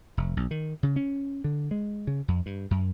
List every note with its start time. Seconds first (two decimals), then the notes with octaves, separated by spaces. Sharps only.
0.17 F1
0.37 B1
0.51 D#3
0.83 C#3
0.96 C#4
1.44 D3
1.71 G#3
2.07 C#3
2.28 F2
2.46 G2
2.71 F#2